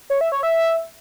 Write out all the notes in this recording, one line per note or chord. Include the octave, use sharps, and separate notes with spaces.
C#5
E5
C#5
E5